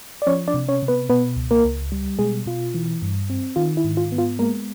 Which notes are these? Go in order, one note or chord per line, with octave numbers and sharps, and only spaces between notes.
D5
F3 C#4 C#5
D4 D5
C3
C#4 C#5
C3
B3 B4
B2 B3 B4
C#2
A#3 A#4
C#2
G3
B2 G#3 G#4
B2 F4
E3
G2
C4
D#3 F4
E4
G#2
F4
B3
F4
G#3 A#3 A#4